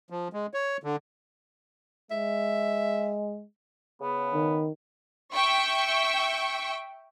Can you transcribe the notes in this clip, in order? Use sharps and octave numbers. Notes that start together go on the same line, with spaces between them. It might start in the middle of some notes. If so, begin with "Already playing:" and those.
F3
G#3
C#5
D3
G#3 E5
C#3 B3
D#3
E5 G5 C#6